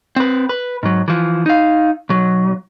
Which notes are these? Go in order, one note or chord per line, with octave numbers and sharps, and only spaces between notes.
C4 B4
B4
G#2 F#3
E3 F3
D#4 F5
B1 F#3